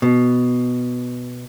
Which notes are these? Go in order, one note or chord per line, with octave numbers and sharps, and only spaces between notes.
B2